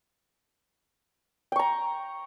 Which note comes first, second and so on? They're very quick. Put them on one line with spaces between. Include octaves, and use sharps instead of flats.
G5 C#6 A#5